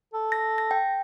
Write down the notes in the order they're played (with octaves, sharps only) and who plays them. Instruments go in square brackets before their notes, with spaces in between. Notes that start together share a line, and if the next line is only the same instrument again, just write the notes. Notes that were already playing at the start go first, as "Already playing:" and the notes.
[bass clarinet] A4
[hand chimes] A#6
A#6
G5